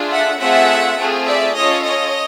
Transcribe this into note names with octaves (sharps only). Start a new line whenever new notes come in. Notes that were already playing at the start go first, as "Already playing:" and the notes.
Already playing: A3 D4 F4 G#4
E5 F#5
A3 C4 F4 G#4 E5 F#5
A3 C4 F4 G#4
D5 E5
C#4 F4 A4 C#5 D#5
C#5 D#5